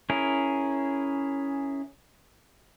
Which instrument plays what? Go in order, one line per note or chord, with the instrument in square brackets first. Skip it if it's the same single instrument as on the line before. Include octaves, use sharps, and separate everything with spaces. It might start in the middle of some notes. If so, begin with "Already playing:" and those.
[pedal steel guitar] C#4 E4 G#4 A#4